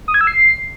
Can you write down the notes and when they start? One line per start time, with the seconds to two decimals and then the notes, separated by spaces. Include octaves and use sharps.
0.08 D#6
0.14 G#6
0.21 E6
0.27 C7